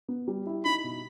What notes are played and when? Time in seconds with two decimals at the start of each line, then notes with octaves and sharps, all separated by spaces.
0.09 B3
0.28 G3
0.47 E4
0.65 D#4 B5
0.84 B2